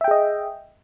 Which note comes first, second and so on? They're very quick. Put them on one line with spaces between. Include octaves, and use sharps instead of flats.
E5 G5 G#4 D#5